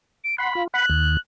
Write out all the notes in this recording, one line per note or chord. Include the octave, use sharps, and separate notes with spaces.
D7
F#5 B5 C6
F4
F#5 B5 F#6
D#2